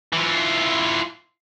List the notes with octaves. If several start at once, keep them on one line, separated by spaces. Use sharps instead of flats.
E3 F4